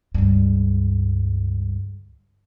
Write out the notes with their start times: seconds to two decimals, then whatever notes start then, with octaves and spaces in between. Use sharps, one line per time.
0.14 C#2 G2